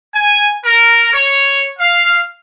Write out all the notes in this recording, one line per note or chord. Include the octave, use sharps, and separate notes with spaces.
G#5
A#4
C#5
F5